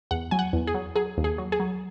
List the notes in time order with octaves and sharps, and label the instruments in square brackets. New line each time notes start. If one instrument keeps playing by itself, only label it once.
[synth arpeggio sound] E2 F#5
F#3 G#5
F#5
E2
G#4
F#3
F#3 G#4
D#2
G#4
F#3
G#4
F#3